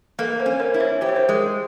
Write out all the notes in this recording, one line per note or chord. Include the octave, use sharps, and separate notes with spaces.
A#3 A4 B4
A#4 C5
C#4
A#4 C5
E4
B4 C#5
G4 C5
C#5
A#4 C5
G#3